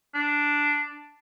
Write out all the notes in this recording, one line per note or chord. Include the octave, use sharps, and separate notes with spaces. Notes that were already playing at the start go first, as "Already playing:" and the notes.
D4